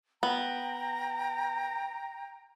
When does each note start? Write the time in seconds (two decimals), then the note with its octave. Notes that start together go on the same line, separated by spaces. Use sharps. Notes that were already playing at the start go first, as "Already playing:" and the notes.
0.23 B3 G5 A#5